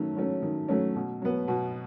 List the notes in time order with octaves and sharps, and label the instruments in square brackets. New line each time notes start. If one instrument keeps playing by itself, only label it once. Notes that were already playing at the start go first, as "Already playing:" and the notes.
Already playing: [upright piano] D#3 F#3 A3 C#4
F#3 A3 C#4
D#3
F#3 A3 C#4
B2
F#3 B3
B2